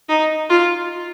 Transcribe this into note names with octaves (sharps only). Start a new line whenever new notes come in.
D#4
F4